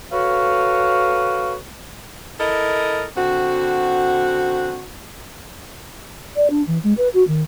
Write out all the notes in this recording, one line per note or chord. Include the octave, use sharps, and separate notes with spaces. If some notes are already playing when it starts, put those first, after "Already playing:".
F#4 A4 B4 C#5 F5
E4 A4 A#4 D#5
D3 C4 F#4
D5
D4
E3
G#3
B4
F#4
D#3